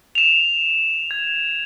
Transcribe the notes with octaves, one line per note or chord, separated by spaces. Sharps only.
E7 F7
G#6